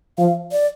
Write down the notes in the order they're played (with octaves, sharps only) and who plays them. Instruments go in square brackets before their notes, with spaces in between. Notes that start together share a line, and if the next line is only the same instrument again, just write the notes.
[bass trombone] F3 [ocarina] F5
[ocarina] D5